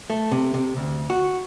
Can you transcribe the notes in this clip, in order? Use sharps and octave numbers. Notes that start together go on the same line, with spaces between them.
A3
C3
C3
D2
F#4